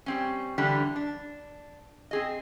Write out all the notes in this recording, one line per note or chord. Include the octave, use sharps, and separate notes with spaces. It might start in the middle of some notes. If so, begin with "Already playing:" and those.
G3 C4 C#4
D3 E3 G3 D4 G4
D4
C4 G#4 D#5